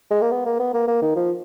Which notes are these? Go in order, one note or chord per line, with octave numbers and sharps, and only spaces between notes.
G#3
A#3
B3
A#3
B3
A#3
A#3
D#3
F3